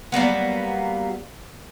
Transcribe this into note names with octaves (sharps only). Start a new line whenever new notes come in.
F#3 G3 A#3 B3